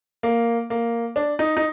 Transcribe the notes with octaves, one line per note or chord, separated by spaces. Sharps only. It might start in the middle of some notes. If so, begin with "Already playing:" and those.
A#3
A#3
D4
D#4
D#4